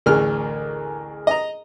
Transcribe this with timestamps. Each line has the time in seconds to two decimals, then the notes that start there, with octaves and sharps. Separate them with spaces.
0.06 A1 D2 G#4 A#4 F6
1.27 D#5 A#5